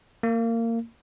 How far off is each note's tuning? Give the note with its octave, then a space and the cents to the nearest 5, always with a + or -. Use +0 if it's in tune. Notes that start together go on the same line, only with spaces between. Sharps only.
A#3 -25